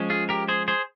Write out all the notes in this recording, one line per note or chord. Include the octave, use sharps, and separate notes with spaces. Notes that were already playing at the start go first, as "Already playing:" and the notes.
Already playing: F3 G#3 C#4
F4 G#4
G4 A#4
G#4 C5
G#4 C5